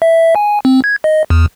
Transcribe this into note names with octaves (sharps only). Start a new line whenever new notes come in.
E5
G#5
C4
G#6
D#5
E2